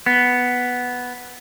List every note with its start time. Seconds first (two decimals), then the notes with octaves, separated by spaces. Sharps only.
0.06 B3